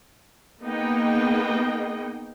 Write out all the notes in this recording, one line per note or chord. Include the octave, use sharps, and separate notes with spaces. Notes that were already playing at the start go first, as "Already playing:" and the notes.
A#3 B3 D#4 G#4 D#5 G5